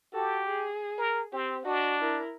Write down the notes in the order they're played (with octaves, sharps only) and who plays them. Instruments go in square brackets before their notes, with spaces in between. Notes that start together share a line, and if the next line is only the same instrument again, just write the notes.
[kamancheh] F#4 A4 [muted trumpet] G4
[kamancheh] G#4
[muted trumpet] A#4
[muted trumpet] C4 [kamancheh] G4
[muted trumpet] D4 [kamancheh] F#4 D#5
[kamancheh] E4 A#4